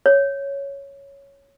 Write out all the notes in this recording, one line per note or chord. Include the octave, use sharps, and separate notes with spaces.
C#5